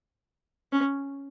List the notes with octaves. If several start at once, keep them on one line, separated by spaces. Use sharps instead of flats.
C#4